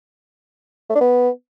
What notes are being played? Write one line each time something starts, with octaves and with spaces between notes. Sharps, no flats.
A3
D4
B3